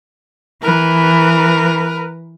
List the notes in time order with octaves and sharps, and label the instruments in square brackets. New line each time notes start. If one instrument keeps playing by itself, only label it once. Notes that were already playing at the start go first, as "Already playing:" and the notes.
[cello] E3 [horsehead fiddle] A#4 B4